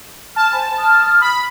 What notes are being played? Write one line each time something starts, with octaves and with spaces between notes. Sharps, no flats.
A5 F6
C5 G#5 B5
D#6 F6
B5